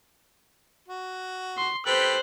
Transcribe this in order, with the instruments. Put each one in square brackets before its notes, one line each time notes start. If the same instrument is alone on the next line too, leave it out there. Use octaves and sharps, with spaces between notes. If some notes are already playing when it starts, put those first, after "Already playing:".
[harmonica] F#4
[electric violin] C6
[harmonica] G4 A4 B4 [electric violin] C5 F#6